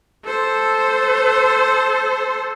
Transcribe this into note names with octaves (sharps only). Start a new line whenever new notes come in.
A4 C5